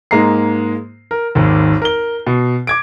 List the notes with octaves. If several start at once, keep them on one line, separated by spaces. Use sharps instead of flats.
G#2 G#3 A#3 A#5 C7
A#4
G#1 D#2
A#4 G7
B2
D6 G#6 D7